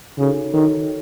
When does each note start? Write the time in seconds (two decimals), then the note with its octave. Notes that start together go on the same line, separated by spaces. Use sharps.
0.18 C#3 D#4 F#4 A4 C#5
0.54 D#3 D#4 F#4 A4 C#5